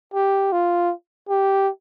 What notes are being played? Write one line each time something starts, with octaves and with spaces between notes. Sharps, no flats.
G4
F4
G4